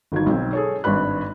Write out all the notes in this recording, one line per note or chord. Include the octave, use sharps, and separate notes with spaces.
G1 D#3 F#3 G#6
B1 C4
G#4 A4 C#5
G#1 G2 B4 B5 F#6